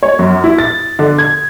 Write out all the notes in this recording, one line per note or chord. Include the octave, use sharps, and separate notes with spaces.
C#5
F#2
E4
A6
D3
G#6